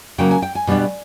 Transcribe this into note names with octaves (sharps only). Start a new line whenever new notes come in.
C#3 F#3 A#3 G5
G#5
G5
G#5
B2 G3 B3 D4